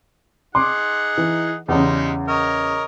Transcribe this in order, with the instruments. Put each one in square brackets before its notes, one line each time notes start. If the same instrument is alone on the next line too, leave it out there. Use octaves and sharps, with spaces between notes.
[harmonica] D#4 G#4 F#5 [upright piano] C6 D6
[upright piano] E3
[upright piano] E2 C#3 [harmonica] G3 G#3 D#4
[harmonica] A#4 C#5 D#5